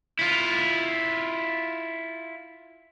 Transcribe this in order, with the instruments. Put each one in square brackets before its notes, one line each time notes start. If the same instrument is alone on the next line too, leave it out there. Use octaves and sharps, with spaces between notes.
[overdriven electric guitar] E4 F4